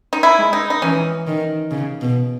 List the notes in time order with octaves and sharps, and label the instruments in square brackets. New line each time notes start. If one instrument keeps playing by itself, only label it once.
[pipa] D#4
E4
[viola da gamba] G#3
[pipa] D#4
D#4
[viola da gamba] E3 [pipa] C#4
[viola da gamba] D#3
C#3
B2